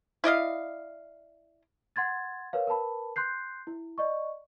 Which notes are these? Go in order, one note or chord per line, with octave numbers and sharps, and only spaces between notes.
E4 D5 D#5 F5
F#5 C6 G#6 A6
A#4 B4 C#5 F5
A#4 B4 A5 B5
C6 F#6 G6 C7
E4
D5 D#5 C#6